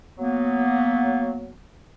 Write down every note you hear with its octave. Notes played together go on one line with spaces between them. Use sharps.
F#3 A#3 B3